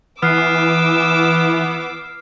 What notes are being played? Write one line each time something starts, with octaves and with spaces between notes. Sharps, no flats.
E3 B3 D6 E6 F6 C7